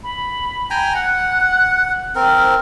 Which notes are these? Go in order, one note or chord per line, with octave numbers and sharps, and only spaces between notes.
B5
G5 G#5 A#5
F#5 F#6
C4 A#4 F6